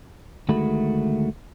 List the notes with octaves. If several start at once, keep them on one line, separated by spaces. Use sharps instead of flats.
D2 D#3 G#3 A3 F#4 B5